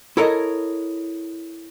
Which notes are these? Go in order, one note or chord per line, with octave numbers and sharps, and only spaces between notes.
E4 A4 A#4 C#5 D#5